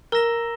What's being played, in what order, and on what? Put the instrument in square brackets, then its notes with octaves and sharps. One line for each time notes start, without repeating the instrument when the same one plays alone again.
[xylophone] A#4 [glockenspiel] A#5 E6 A#6 E7 G7